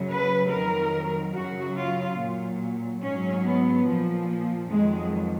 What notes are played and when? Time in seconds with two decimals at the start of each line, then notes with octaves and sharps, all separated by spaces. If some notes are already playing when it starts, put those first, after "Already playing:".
Already playing: F#2 C#3 F#3
0.09 B4
0.50 F2 D#3 F#3 A#4
1.34 F#2 C#3 F#3 F#4
1.76 F4
2.18 A#2 F#3
3.02 G#2 F#3 C#4
3.44 B3
3.87 A#2 F3
4.70 F2 D#3 F#3 G#3